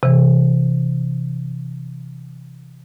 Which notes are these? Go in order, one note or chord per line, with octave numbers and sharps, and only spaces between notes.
C3 E3